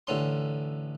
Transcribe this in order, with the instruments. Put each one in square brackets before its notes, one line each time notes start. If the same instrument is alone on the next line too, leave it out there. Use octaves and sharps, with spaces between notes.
[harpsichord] A1 D3 C#4 C6